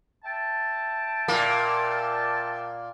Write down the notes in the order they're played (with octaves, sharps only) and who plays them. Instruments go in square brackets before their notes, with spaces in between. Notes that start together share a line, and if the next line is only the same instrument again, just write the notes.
[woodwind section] E5 G5 A5
[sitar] A#2 A#3